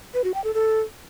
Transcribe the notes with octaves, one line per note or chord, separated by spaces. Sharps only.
B4
F#4
G5
A4
A4